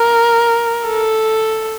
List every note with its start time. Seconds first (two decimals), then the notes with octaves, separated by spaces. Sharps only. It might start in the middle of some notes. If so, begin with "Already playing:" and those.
Already playing: A#4
0.87 A4